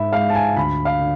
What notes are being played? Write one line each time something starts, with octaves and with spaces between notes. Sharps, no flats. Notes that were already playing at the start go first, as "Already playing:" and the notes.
Already playing: G#2 E5 B5
G#3 F5
A5
G#5
D2 B5
F5
D3